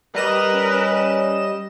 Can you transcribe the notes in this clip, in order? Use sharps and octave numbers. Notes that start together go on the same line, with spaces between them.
G3 A#4 B4 D#5 E7
C#4